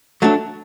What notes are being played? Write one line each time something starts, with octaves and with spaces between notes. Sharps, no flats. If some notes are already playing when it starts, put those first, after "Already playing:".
F#3 A3 D4